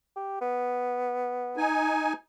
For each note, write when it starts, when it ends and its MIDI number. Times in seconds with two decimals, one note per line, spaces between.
0.17 0.37 67
0.41 1.66 59
1.57 2.13 63
1.57 2.13 80